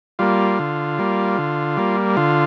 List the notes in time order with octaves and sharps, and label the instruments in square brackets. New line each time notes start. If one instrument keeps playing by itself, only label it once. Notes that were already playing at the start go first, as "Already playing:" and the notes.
[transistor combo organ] G3 A#3 F4
D3
G3 A#3
D3
G3 A#3
D3 F4